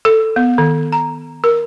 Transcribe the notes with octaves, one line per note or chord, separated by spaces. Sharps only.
A4
B3
D#3
A#5
A#4